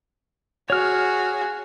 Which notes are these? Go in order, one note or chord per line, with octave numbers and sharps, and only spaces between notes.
F#4 G#4 C#5 F6